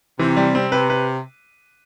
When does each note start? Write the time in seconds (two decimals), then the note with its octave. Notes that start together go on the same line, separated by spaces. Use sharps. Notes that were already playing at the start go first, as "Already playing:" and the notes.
0.19 C3 E3
0.37 G3
0.55 C4
0.72 C3 B4
0.90 B4